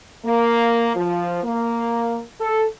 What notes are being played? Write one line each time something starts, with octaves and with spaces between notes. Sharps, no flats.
A#3
F3
A#3
A4